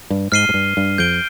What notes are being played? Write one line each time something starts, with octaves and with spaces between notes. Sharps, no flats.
G2
G#2 F6 C7 D#7 G7
G#2
G2
G2
F2 G6 D7 G7